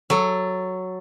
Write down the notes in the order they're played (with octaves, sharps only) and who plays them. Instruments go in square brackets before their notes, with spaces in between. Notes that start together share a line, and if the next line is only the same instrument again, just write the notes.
[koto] F#3 A4